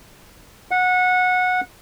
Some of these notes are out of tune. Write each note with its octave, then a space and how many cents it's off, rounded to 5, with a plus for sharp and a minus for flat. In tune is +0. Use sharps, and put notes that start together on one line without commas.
F#5 -20